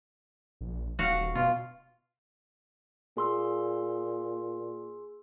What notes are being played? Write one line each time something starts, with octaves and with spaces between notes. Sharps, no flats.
A#1
D#1 F#4 F5
B2 F4
A#2 G#4 C6 E6